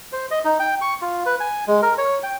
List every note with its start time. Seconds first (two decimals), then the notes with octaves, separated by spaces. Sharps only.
0.13 C5
0.31 D#5
0.45 D#4
0.60 G5
0.81 C#6
1.02 F4
1.26 B4
1.40 G#5
1.67 G#3
1.82 A#4
1.98 C#5
2.23 G5